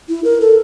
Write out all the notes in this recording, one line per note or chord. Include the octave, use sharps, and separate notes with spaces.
E4
A#4
A4